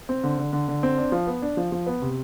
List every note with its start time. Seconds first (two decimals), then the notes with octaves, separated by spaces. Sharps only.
0.09 C4
0.24 D3
0.38 D3
0.53 D3
0.68 D3
0.83 C4
0.98 D4
1.12 F3
1.27 B3
1.42 D4
1.57 F3
1.72 F3
1.86 B3
2.02 C3